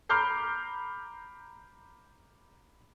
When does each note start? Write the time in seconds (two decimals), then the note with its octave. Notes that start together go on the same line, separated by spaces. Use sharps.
0.09 A#5 B5 D6 F6 G6 C7